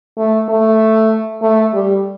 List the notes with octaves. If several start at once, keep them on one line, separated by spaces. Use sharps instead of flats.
A3
A3
A3
G3